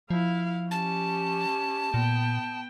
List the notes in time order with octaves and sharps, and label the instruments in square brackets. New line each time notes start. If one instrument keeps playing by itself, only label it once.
[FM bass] F3 [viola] E4 F5
[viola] C#4 G4 [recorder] A5
[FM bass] A#2 [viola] B3 G5